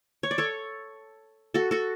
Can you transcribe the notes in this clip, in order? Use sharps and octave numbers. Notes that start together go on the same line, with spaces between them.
C#5
D5
A4 C#5
F#4 A4
F#4 A4